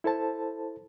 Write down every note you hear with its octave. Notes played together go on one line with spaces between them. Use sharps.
E4 A4 C5 A5